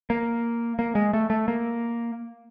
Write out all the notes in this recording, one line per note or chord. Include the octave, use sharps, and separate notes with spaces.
A#3
A#3
G#3
A3
A3
A#3